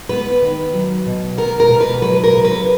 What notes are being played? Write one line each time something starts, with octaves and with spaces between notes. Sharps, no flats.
B3 B4
D#3
F#3
B2
B3 A#4
A#4
B2
B4
F#3 B4
A#4
C#3
B4